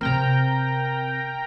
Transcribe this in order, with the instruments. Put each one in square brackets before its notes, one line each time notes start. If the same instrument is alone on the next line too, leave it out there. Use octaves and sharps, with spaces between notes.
[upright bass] C3 C4 [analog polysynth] A#4 G5 A#5